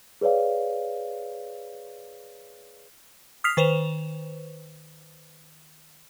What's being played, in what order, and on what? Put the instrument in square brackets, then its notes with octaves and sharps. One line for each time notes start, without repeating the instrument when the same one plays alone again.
[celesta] G#4 B4 C#5 D5 F5
[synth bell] D#6 F6 B6 C7 F7
D#3 B4 C5 E7 F7